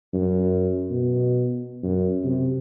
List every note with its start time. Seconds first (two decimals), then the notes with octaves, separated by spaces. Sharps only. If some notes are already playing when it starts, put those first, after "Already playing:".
0.14 F#2
0.90 B2
1.83 F#2
2.25 C3